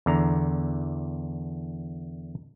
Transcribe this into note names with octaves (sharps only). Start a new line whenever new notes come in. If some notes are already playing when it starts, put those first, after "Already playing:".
E2 D3 A#5